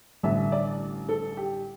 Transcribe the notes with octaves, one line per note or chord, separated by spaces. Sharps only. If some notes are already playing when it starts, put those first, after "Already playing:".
A1 G2 D3 E5
D5
A4
G4